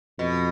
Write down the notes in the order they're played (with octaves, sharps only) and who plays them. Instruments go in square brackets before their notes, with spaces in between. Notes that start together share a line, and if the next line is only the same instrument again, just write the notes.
[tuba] F2 [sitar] B2